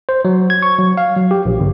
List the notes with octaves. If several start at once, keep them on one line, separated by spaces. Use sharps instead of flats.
C5
F#3
G#6
C#6
F#3
F5
F#3
G4
A#1
G1